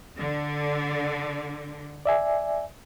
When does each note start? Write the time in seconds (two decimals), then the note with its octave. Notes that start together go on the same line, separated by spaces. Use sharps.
0.17 D3
2.06 D5 E5 G#5